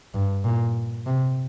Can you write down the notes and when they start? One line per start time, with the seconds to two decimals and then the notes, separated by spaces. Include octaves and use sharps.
0.14 G2
0.44 A#2
1.06 C3